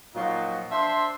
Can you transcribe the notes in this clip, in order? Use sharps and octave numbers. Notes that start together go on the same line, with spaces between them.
A#2 F3 F#3 D#4 F#4
D4 C5 E5 C6